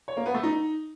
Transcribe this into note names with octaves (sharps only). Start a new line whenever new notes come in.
C#5
A#3
B3
A3
D#4